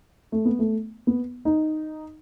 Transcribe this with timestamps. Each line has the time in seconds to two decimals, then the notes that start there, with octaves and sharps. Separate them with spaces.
0.32 A3
0.45 B3
0.59 A3
1.07 B3
1.45 D#4